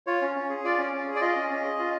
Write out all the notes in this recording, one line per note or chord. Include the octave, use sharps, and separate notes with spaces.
F4 C#5
C#4
C#4
G#4
F4 D5
C#4
C#4
G#4
D5
F4 D#5
C#4
C#4
G#4
F4